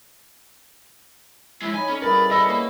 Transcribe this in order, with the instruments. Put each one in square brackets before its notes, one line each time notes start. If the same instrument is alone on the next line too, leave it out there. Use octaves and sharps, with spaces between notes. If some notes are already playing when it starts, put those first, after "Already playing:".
[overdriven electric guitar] F3 G#3 [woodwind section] E4
[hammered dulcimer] D#4 [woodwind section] C#5 B5 [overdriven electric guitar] G#5
[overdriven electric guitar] C#4 [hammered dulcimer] A4 D5
[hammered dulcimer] C#3 B3 E4 [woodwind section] G3 G#4 B5 [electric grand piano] A#4 [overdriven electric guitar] D5
[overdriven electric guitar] A#4 A5 [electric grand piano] D#5 E6 A#6
[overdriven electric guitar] A#3 [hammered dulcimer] A#4 C#5 F5